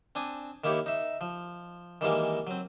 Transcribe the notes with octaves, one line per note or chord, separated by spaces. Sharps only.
C4 D4 G#5 D#6
D#3 A#3 E4 G4 C#5
D#4 E5
F3
D#3 E3 G3 G#3 A#3
F#3 C4